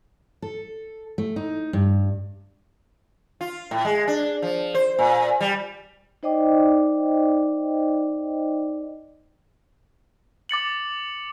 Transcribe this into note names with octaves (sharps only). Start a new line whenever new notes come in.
A4
A3
D#4
G2
F4
A2
G#3
D4
F3
C5
A#2
G3
D#4 C5 D5 D#5 G5 D6
D6 A6 C#7 F#7